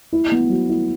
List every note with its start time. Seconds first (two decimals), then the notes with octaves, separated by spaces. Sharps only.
0.13 E4
0.32 B3
0.50 F#3
0.69 E4